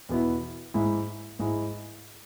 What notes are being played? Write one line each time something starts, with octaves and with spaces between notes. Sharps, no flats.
E2 B2 B3 E4
G#2 G#3 E4
G#2 G#3 E4